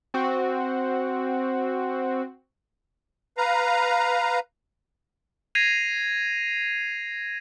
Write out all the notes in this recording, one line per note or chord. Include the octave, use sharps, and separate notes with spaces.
C4 F#4
B4 F5 A#5
G#6 A#6 C7 D#7 F7